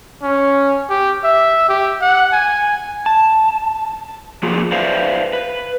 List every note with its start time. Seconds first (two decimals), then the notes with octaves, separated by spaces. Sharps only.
0.23 C#4
0.90 G4
1.24 E5
1.69 G4
2.01 F#5
2.33 G#5
3.06 A5
4.43 F3 A#3 F4 F#4 G#4
4.72 B4 C5 D5 E5 F5
5.33 B4